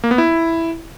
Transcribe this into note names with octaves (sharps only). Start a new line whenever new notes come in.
A#3
B3
E4